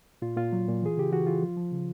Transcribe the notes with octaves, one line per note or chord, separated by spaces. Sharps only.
A#2 F4
A#2 F4
F#3
A#2
E3 G#4
C#3 G4
E3 F#4
E3 F4
F3
F3
C#3